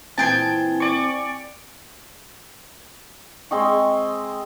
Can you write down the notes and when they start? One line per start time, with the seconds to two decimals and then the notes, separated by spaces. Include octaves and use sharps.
0.18 A#2 E3 C4 G#4 G5 A5
0.80 D5 C#6
3.51 G#3 C4 D#5 C#6